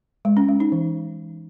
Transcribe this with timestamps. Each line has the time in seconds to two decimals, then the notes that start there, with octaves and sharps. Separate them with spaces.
0.25 G#3
0.37 C#4
0.48 G#3
0.60 D#4
0.72 E3